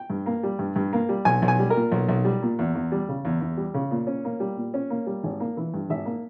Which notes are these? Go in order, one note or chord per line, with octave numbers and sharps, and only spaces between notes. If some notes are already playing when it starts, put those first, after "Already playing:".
Already playing: G5
G2
A#3
G3
G2
G2
A#3
G3
B1 G#5
B1
G#5
G3
A#4
A#2
B1
B1
G3
A#2
E2
E2
G3
C#3
E2
E2
G3
C#3
A#2
C#4
A#3
G3
A#2
C#4
A#3
G3
G#1
A#3
E3
G2
G#1 E5
A#3